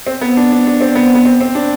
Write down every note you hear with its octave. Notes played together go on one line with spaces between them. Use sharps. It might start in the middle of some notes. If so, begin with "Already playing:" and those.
C4
B3
D4
D4
D4
C4
B3
B3
C4
C4
D4